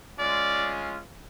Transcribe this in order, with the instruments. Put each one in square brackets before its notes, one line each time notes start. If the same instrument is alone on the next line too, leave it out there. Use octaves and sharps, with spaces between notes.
[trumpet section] G#3 C#4 F4 D5